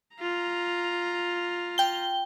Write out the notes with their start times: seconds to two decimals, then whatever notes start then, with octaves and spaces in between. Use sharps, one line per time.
0.17 F4 A#5
1.78 G5 G7